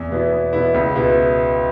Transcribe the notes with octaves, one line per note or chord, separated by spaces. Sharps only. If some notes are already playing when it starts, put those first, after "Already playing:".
Already playing: E2
B2 B3 E4
E2
B2 B3 E4
C#2
B2 B3 E4